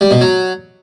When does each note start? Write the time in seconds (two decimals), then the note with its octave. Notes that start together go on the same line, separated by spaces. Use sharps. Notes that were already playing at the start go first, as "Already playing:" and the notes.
0.01 G3
0.11 B2
0.21 F#3